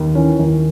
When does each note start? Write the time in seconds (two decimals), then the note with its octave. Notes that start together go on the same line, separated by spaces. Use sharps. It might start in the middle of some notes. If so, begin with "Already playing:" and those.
Already playing: D#2
0.15 E3 C#4
0.39 D#2